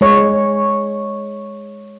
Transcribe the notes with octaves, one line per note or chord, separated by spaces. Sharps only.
G#3 C#5